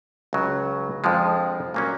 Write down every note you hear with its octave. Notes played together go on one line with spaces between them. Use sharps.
C#2 C#3 F#3
F2 D3 F3 G#3
A#2 F#3 A#3 C#4